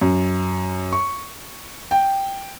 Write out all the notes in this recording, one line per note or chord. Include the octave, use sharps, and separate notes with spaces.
F#2
C#6
G5